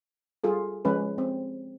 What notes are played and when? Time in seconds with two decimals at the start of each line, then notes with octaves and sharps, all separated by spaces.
0.44 G3 F4 G#4 A4
0.85 F3 G#3 C#4 B4
1.18 C4